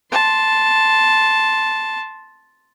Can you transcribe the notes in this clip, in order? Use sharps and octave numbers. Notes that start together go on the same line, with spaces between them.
A5 C6